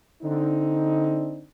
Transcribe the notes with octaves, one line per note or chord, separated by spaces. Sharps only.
D3 C4 D4 D#4